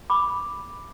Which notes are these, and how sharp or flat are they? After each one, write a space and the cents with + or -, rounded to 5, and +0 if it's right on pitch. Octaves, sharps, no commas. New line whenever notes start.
B5 +0 D6 +0